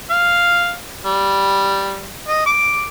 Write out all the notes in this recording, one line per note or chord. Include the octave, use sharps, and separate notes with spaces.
F5
G3
D#5
D6